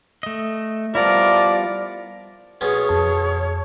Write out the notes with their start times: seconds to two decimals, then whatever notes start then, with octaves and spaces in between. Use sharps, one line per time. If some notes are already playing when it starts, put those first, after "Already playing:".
0.23 A3 D#5
0.95 F3 G3 B3 E4 A#4 D5
2.61 B1 B3 C#4 G#4 C#5
2.89 F2 A5